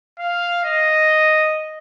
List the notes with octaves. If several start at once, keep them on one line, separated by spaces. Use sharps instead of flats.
F5
D#5